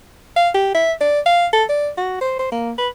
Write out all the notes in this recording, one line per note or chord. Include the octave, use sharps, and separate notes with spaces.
F5
G4
E5
D5
F5
A4
D5
F#4
C5
C5
A#3
B4